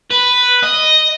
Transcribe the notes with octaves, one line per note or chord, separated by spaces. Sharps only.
B4
D#5